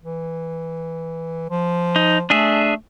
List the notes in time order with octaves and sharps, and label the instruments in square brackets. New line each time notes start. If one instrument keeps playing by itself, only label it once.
[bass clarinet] E3
F3
[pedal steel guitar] D#4
[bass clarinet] A3 [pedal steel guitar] D4 G#4 E5